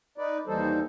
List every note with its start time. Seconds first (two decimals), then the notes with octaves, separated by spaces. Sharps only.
0.18 D#4 B4 D5
0.47 D#2 E3 G3 D#4 A4 C5